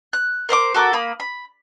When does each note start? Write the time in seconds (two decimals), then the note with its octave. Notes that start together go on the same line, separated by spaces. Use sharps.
0.13 F#6
0.49 A#4 C5 E5 D6
0.74 F#4 A4 A#4 D6
0.93 A#3 B5 D#6
1.20 B5